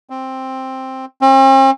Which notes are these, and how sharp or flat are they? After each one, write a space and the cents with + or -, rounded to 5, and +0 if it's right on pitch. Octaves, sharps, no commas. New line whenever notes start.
C4 +5
C4 +45